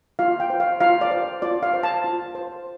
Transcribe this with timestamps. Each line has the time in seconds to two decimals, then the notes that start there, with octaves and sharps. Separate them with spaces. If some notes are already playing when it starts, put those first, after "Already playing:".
0.19 F4 F5
0.40 G5
0.50 C5
0.60 F5
0.80 F4 F5
1.01 D5
1.11 C5
1.42 F4 D5
1.63 F5
1.73 C5
1.83 A5
2.04 F4
2.35 C5